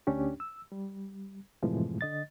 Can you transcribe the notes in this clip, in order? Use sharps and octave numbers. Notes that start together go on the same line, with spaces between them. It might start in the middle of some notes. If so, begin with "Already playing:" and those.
D2 C#4 D4 G4
E6
G3
F#2 A2 C3 E3 F3 G#3
D3 D#5 A6